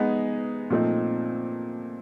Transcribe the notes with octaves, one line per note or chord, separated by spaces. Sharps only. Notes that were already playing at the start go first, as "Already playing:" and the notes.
Already playing: G#3 B3 D#4 G#4
A#2 F3 A3 C4 D#4